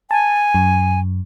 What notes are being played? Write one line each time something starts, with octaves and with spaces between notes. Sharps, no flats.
G#5 A5
F#2